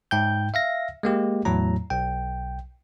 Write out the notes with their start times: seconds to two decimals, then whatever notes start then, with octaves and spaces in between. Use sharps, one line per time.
0.11 G#2 G5 G6
0.54 E5 F5 A#6
1.03 G#3 A#3 G4
1.45 E2 A2 F#3 A#5
1.90 B1 G5